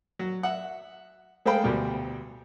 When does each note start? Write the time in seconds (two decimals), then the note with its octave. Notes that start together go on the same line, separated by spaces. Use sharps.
0.19 F#3
0.43 E5 F#5
1.45 G#3 A3 C5 F5 G5 B5
1.64 D2 B2 G3